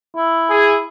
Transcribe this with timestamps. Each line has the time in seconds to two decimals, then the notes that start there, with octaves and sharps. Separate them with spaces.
0.16 E4
0.50 G#4